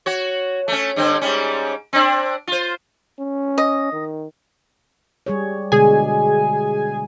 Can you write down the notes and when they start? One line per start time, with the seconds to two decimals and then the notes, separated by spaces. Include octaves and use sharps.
0.06 F#4 C#5
0.68 A3 C#4
0.96 G2 D3 C4
1.22 G#2 G3 C#4
1.93 C4 D4
2.47 F4 C5
3.19 C#4
3.58 D#5
3.92 D#3
5.26 G3 G#4 C#5
5.72 B2 D3 G#3 G#4 G#5